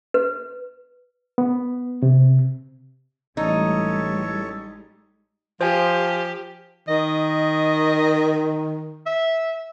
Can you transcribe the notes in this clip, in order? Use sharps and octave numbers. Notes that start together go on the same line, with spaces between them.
B4
B3
C3
A1 G3 G#3 D#4 A4 C#5
F3 G4 C5 G#5
D#3 D#5
E5